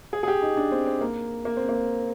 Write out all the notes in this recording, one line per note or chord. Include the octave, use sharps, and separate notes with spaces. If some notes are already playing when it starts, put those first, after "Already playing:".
G#4
G#4
G4
D#4
D4
C4
C4
A#3
A#3
C4
A#3